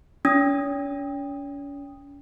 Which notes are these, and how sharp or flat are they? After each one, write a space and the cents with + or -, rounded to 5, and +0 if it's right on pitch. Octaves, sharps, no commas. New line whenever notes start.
C#4 +40 D#6 +0